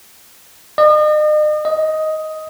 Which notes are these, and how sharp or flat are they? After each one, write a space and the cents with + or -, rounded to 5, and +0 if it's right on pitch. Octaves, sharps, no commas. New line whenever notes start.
D#5 -40
D#5 +10